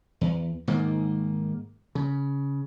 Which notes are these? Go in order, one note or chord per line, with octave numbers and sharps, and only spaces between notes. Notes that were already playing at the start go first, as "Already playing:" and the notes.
E2
G#2 D#3 A#3
C#3